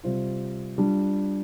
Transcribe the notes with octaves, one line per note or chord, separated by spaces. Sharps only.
C3 G3 C4 F4
G3 D4 F4